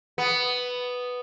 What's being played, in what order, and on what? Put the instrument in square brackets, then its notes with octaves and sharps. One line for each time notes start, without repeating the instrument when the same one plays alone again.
[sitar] B3